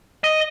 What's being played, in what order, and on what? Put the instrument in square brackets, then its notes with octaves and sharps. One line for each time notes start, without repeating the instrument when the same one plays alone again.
[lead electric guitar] D#5